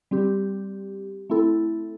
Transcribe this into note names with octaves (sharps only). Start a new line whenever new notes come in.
G3 C4 G4
A3 C4 E4 A4